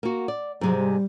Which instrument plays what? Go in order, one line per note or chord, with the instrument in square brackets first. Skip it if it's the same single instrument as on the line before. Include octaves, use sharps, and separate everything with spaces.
[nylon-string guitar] A#3 F#4
D5
[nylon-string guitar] G#2 C3 G#3 [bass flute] F#3
[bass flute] G3